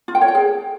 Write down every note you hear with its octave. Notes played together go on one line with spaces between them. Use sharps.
F4
G5
C#5
G5
G#4